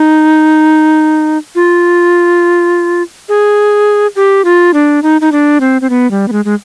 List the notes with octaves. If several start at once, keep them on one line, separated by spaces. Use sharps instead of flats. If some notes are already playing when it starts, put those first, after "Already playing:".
Already playing: D#4
F4
G#4
G4
F4
D4
D#4
D#4
D4
C4
C4
B3
G3
B3
G#3
G#3